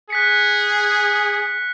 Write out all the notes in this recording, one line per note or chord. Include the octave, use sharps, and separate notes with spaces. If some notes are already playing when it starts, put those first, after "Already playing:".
G#4 F#6 B6 C#7